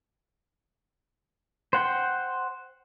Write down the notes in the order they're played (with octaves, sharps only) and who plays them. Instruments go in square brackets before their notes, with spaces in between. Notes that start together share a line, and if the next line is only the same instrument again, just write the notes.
[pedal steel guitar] C5 F#5 G5